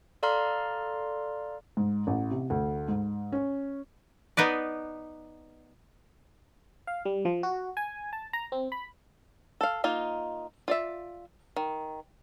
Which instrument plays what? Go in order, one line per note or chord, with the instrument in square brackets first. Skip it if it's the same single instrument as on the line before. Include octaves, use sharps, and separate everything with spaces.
[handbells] A4 D5 F5 A#5 C6 F6
[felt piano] G#2
A1
C3
D2
G#2
C#4
[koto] B3 D#4 B4 D5
[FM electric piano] F5
G3
F3
F#4
G#5
A5
A#5
C4
B5
[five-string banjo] A4 F5
A#3 D#4 F4
F4 D5 E5
D#3